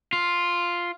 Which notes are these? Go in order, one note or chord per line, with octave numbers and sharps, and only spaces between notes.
F4